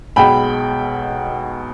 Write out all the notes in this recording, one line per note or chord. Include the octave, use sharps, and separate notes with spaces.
B1 B2 G#3 G5 B5